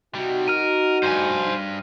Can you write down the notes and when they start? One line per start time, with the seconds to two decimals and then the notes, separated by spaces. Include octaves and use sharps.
0.15 C3 G3 D#4 F#4
0.48 A#4 F6 D#7
1.03 G2 C5 G#5